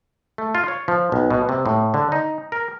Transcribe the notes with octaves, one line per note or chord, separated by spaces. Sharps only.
A3
F4
C#5
F3
B1
B2
C3
A2
D3
D#4
A#4